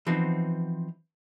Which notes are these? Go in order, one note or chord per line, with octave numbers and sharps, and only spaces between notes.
E3 F3 B3 C4 D#4 F#4